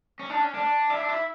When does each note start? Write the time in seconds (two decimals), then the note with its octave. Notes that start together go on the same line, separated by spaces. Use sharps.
0.19 C#4
0.30 D4
0.41 C#4
0.54 D4
0.90 E4
1.00 D4
1.09 E4